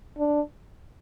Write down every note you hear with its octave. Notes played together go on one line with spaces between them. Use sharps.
D4